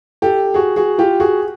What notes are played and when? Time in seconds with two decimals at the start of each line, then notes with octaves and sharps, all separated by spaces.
0.22 G4 A4
0.54 F#4 G#4
0.76 F#4 G#4
0.98 F4 G4
1.20 F#4 G#4